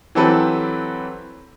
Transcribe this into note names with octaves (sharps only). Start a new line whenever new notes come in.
E3 F#3 C4 G4 A4 B4